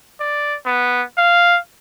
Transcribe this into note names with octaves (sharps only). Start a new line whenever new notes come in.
D5
B3
F5